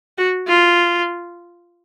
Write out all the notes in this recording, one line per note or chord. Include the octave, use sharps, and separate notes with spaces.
F#4
F4